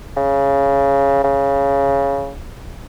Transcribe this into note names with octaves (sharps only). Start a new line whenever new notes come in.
C#3
C#3